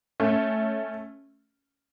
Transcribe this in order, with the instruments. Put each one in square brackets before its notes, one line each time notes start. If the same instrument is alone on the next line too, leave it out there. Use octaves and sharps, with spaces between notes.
[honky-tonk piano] A3 C#4